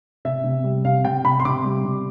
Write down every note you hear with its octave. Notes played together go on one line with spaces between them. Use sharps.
C3 E5
C3
G3
C3 F5
C3 G5
C3 B5
C6
C3 D6
G3
C3